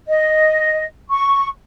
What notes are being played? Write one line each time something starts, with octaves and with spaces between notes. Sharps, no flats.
D#5
C#6